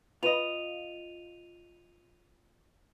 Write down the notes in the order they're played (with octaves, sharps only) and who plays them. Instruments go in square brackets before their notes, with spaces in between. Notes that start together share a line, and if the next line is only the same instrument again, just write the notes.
[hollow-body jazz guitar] F4 [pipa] B4 D#5 [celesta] D#7 F7